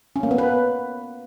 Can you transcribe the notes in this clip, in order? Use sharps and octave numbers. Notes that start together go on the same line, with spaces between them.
C#4
A#3
B3
B4